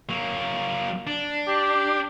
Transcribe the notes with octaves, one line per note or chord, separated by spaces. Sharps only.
F#3 A#3
D4
G4